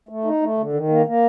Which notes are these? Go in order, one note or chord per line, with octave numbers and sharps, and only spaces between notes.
A3
D#4
A3
D3
D#3
A#3
A#3